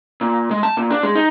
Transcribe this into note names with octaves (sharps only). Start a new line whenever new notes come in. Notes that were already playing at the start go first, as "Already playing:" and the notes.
A#2
G#3
A5
A#2
D4
G#3
D#4